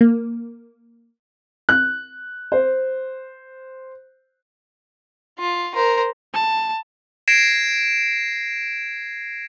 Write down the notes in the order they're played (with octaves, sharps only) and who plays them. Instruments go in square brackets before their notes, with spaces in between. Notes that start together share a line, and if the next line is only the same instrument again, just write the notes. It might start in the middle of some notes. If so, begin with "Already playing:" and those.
[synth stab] A#3
[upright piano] F#6
C5
[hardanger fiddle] F4
A#4 C5
[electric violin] A5
[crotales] G#6 A#6 C7 D7 E7